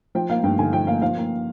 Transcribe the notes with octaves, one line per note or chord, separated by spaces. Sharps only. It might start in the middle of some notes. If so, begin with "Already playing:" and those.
F3 G5
A#3 F5
G2 G5
D3 G#5
F3 G5
A#3 F5
F3 F5
A#3